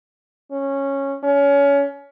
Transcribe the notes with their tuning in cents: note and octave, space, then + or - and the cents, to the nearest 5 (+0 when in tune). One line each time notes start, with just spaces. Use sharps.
C#4 -10
C#4 +25